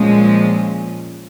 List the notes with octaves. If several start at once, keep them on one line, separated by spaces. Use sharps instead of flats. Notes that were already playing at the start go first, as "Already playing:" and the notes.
Already playing: A#2 F3 G#3 C#4